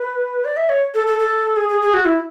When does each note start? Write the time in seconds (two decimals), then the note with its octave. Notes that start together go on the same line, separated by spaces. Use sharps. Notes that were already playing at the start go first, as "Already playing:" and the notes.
Already playing: B4
0.45 D5
0.57 E5
0.69 C#5
0.94 A4
1.07 A4
1.19 A4
1.56 G#4
1.69 G#4
1.81 G#4
1.94 F#4
2.05 E4